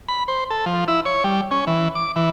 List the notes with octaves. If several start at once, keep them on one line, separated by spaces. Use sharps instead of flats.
B5
C5
A4
F3
E4
C#5
G3
C#4
E3
D6
E3